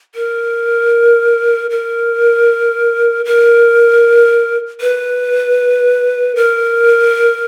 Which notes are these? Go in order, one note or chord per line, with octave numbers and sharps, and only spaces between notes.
A#4
A#4
A#4
B4
A#4